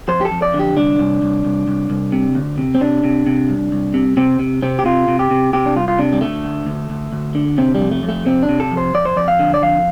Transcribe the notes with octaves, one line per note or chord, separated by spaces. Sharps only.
F2 C5
G4
A4
F2
D5
D3
G4
C2 D4
C2
C2
C2
C2
C2
C3
D2
C3
C4
C3 D4
C3
C3
C2
C2
C3
C3 C4
C3
C3 C4
G4
C3 F4
C3
G4
C3
C3 G4
D4
C2 F4
F4
C3 D4
G3
D3 A3
D2
D2
D2
D2
D3
C3 C4
G3
F2
A3
F2
A3
C3 C4
D4
C3
A4
F2
C5
F2 D5
C5
F2 D5
F5
D3
D5
F2 F5